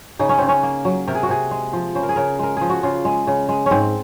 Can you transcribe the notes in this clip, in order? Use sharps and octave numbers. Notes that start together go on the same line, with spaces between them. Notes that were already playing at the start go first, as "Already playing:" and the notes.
C#3 D#4
C#4
C#3 C4
C#4
A#3
F#3
C3 A#4
G#4
F#4
C3 G#4
G#3
F3
C#3 C5
A#4
G#4
C#3 A#4
G#3 A#4
F3 G#4
F#4
C#3 F4
G#3
C#3
G#3
C#4
G#2 C4